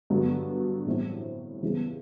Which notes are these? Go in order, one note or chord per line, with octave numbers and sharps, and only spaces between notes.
G2 D3 F#3 B3
A2 E3 G3 C4 E4
E2 C#3 E3 G3 B3